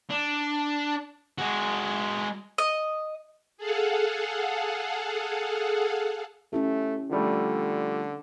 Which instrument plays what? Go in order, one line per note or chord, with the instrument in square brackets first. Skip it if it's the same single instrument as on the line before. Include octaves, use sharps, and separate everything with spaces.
[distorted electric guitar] D4
G#3 F#4
[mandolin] D#5
[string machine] G#4 A4 F5 F#5
[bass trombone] A3 [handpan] C#4 E4 G4
[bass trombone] D3 [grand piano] F3 G3 A3